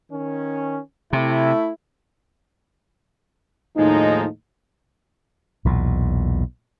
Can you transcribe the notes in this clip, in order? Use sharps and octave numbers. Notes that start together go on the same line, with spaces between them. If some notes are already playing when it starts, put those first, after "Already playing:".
D#3 C#4
C3 A3 E4
D#2 A2 F3 G#3 D#4
B1 E2 A#2